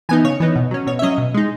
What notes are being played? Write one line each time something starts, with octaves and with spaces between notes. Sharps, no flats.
E3 B3 D#4 G#5
C#3 C#5
E3 B3 D#4
B2
F#3 C#4
B2 C#5
E5
F#3 C#4 D#5
B2
G#3 D#4